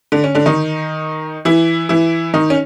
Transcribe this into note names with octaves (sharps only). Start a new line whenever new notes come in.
D3 D4
C#4
D3 D4
D#3 D#4
E3 E4
E3 E4
D#3 D#4
C#4